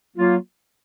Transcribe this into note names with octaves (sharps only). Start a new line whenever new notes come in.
F#3 A#3 F4